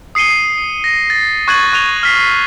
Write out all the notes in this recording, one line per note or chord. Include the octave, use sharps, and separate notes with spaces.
D#6 C7 C#7 D#7 G7
A#6
A6
C#6 F#6 G#6 A6 D#7 F#7
C#6 F#6 D#7 F7 G7
F6 B6 C7